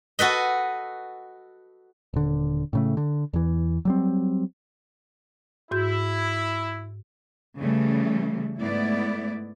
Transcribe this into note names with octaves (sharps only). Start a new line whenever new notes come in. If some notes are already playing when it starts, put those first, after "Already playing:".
F#4 A4 B4 D#5
D#1 D3
A2 C#3 A3
D3
E2 E3
F#3 G3 C4
G#2 E4 F#4 G6
C#3 E3 G3 A3
G#2 A3 B3 E4 D5